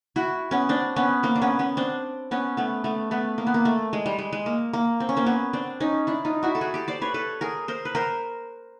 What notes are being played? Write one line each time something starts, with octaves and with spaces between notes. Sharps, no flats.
E4 F#4
B3 C#4
C4 D4
B3 C#4
A#3 C4
D4
B3 C#4
B3 C#4
C4 D4
B3 C#4
A3 B3
A3 B3
A3 B3
A#3
B3
A#3
A3
G#3
G3
G#3
G#3
A#3
A#3
C4
C#4
A#3 C4
B3 C#4
C4 D4
C#4 D#4
D4 E4
D#4 F4
E4 F#4
A4
F#4 G#4
G4 A4
C5 D5
B4 C#5
A4 B4
G#4 A#4
A#4 C5
B4
A#4 C5